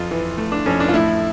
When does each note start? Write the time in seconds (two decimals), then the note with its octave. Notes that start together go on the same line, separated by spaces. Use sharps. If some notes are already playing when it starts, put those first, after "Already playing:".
Already playing: F2 F4
0.11 E3
0.38 A3
0.52 D4
0.66 F2 C#4
0.80 D4
0.88 F4
0.93 A2 E4